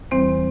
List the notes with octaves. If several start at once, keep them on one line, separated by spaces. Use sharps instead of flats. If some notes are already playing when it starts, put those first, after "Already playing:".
E2 E3 G3 C4 C5